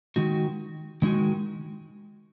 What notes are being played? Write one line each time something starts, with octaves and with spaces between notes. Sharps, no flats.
D#3 G#3 D#4 F#4
D#3 G#3 D#4 F#4